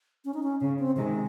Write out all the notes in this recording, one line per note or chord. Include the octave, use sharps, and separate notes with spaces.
C#4
D#4
C#4
C#3 C#4
C4
C3 D#3 G#3